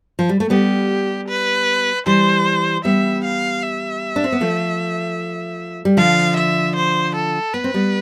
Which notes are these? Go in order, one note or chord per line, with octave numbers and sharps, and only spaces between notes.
F3
G3
A3
G3 B3 G4
B4
E3 G3 C5
G3 B3 E5
F5
E5
D4
C4
B3
F3 A3
G3
D3 F3 F5
E5
C5
A4
B3 B4
C4
G3 B3